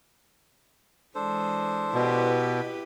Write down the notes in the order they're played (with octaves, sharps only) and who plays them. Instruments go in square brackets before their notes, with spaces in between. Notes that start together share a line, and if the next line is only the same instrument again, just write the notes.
[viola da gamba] E3 G#3 [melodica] D4 A4 C5
[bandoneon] B2 [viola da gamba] E4 G4 B4